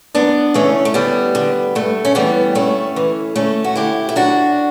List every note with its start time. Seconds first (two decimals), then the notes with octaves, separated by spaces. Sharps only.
0.15 F#2 B3 D4
0.54 C#3 E3 A3 C#4
0.85 A3
0.94 D2 G3 B3
1.35 D3
1.75 G2 A3
2.05 C#4
2.15 E3 G3 B3
2.55 G2 A3 C#4
2.96 E3
3.35 D2 A3 C#4
3.64 F#4
3.75 D3 E4 G4
4.09 E4
4.16 F#2 D4 F#4